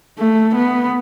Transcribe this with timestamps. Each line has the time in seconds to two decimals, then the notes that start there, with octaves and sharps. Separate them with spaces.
0.18 A3
0.55 B3